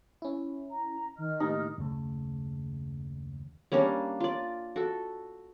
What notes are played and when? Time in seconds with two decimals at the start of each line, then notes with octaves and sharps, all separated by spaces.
0.22 C#4 E4
0.71 A#5
1.18 D#3 D#5 F6
1.40 A2 A#3 D#4 G4
1.78 F#1 D#2 C#3 A3
3.72 G3 A#3 C#4 D4
4.20 F4 D5
4.76 F#4 A4